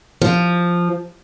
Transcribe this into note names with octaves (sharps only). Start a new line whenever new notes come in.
F3